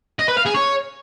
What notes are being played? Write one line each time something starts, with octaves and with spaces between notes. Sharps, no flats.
D#5
B4
F5
G#4
C#5